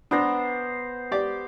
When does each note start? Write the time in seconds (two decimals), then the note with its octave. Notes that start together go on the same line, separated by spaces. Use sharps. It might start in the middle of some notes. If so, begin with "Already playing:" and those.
0.11 B3 D4 C5 A#5
1.11 G4 D5